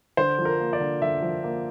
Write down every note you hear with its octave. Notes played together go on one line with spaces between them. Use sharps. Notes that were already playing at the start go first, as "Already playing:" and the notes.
D3 C5
F3
A#4
A#3
D5
D3
D3 E5
F3
A#3